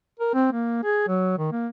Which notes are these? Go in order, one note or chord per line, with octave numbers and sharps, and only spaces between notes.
A#4
C4
A#3
G#4
F#3
D#3
A#3